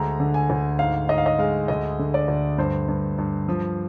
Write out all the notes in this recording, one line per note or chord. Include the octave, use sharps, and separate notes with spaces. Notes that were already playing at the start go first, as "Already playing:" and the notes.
Already playing: D2 G#3 A#5
D3
G#5
D2
G#2 F5
G#2 D#5
F5
D#5
G#3 F5
D2 D#5
D3
D5
D2
G2 C5
G2
G2
F3